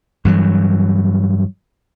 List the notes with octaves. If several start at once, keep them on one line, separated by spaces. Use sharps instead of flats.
G2 E3 F#3